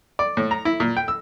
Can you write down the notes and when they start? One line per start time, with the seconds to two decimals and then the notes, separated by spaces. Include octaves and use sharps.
0.19 D5
0.37 A2
0.51 A#5
0.65 E4
0.80 A#2
0.97 G5
1.08 E6